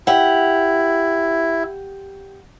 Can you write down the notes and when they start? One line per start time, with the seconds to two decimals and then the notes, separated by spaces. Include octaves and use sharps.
0.07 E4 G4 F#5